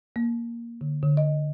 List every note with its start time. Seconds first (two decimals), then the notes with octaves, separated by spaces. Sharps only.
0.16 A#3
0.81 D3
1.03 D3
1.17 D#5